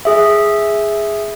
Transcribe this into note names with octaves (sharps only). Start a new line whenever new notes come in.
G#4 E5